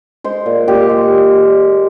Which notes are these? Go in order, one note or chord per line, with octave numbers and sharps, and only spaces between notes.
G#3 C5
A#2
A#2 G4
G#3